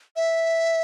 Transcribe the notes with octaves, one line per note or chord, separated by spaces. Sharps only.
E5